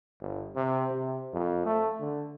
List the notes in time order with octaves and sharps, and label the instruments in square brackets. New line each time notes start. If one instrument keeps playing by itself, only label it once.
[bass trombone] G1
C3
C3
F2
A3
D3